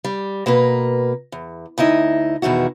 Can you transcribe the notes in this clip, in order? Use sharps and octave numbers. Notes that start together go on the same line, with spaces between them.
G3
B2 A#3 A#4 B4
E2
D2 D#4 E4 D#5
E2 B2 D#3 E4 F#4